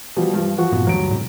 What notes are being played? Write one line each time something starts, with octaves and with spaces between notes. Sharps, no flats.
B2 F3 G3
G2 F3
F2 F3 F#4
G2 A#2 B3
D2 G2 F#3 D7
G#2 B2